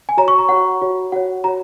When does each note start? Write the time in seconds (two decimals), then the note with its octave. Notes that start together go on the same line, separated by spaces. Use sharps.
0.09 G#5
0.17 F#4 C#5 A#5
0.28 C#6
0.38 A#5
0.49 F#4 C#5 F#5
0.81 F#4 C#5
1.12 F#4 C#5 F#5
1.44 F#4 C#5 A#5